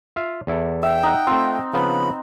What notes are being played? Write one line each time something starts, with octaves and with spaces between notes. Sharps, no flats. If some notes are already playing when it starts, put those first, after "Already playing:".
F4 E5 F5
E2 E4 A4
E5 G5
D#4 F#5
A3 C4 F4
C#3 F3 B3 B5